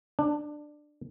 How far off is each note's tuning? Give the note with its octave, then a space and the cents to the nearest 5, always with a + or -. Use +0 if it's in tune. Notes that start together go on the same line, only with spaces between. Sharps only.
D4 +15